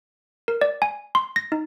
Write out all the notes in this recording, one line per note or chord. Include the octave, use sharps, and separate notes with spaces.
A#4
D5
G#5
C6
A#6
D#4